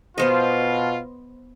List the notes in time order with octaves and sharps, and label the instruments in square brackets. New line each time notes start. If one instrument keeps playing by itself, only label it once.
[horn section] B2 F4 [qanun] B3 C5 D#5